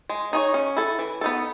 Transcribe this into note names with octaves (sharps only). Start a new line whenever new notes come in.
G#3
D#4 G#4 C#5
C#4
E4 A4
E3
B3 D#4 A4